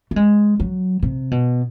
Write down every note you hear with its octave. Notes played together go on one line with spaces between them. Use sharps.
A3
G#3
F#3
C3
B2